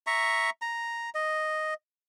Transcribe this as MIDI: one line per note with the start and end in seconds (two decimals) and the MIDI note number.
0.07 0.50 76
0.07 0.50 82
0.07 0.50 85
0.62 1.10 82
1.15 1.74 75